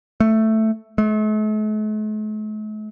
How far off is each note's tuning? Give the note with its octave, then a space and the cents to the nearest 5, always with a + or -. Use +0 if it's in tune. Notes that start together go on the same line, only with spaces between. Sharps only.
A3 +5
A3 -45